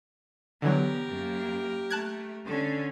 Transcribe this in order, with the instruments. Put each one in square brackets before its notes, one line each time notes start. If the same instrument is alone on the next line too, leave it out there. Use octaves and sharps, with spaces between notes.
[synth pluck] D3 E3 F#3 [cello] B3 [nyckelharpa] G4 A#4
[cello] F#2 A#3
[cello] A3 [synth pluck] A5 F#6 G#6
[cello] D3 C#4 [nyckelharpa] A4